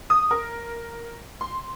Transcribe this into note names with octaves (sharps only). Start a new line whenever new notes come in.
D#6
A#4
C6